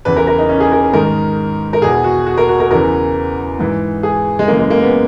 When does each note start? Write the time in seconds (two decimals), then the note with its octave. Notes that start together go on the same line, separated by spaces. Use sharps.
0.05 E2 C#3 E3 B4
0.16 A#4
0.27 A#4
0.38 D#4
0.49 C#4
0.60 G#4
0.72 A#4
0.93 G#2 D#3 A#4
1.73 A#4
1.82 E2 B2 G#4
2.04 F#4
2.26 F#4
2.38 A#4
2.49 F#4
2.60 A#4
2.71 E2 C#3 E3 A#4
3.59 G#2 E3
4.03 G#4
4.39 G#3
4.48 F#2 C#3 E3 A#3
4.59 G#3
4.70 A#3
4.82 B3